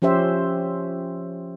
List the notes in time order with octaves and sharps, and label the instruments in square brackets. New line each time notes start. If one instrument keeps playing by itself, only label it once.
[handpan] F3 C#4 G4 C5 E5